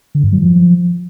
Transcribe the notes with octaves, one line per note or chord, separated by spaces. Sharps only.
D3
G2
F#3
F3